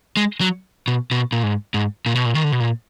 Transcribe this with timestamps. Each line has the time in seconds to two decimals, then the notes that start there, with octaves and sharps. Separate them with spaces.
0.17 G#3
0.41 F#3
0.88 B2
1.11 B2
1.32 A#2
1.43 G#2
1.74 G#2
2.06 A#2
2.15 B2
2.25 A#2
2.35 D#3
2.44 D3
2.52 B2
2.60 A#2